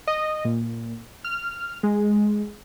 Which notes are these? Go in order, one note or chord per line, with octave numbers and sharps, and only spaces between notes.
D#5
A#2
F6
G#3